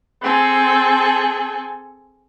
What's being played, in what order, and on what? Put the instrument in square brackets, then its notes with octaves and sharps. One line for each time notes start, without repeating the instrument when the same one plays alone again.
[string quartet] C4 G#4 A4